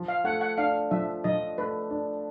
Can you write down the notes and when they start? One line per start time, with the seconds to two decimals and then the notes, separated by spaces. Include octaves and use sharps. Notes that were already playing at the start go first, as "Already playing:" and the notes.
Already playing: F3
0.08 F5
0.24 A3 F#5
0.41 F#5
0.58 D4 F5
0.91 F3 E5
1.24 F3 D#5
1.58 A3 B4
1.90 D4